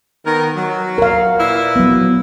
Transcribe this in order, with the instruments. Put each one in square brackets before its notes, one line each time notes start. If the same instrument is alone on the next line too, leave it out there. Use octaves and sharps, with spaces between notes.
[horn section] D#3 B3 A#4
F#3
[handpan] A#4 F5
[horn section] A#2 E4 B4
[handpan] F#3 B3